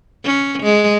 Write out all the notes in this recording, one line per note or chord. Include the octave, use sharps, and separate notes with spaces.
C#4
G#3